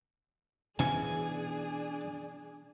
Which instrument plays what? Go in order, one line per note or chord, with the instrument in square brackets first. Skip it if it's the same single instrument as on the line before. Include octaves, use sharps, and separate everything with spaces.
[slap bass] B2 E3 C#4 [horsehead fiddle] D4 G#4 [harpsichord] G#5